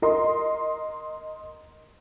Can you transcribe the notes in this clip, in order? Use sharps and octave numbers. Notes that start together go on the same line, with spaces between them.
A#4 D#5 C6